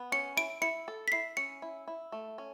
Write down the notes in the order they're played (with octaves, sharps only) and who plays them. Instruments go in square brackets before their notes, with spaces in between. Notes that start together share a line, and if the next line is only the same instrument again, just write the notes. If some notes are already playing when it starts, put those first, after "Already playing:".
Already playing: [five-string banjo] B3
[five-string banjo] C#4 [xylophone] C#7
[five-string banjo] E4 [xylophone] D7
[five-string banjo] E4 [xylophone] C#7
[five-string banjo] A4
[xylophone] B6
[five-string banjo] E4 [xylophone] C7
[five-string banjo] C#4 [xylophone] C#7
[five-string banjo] E4
E4
A3
C#4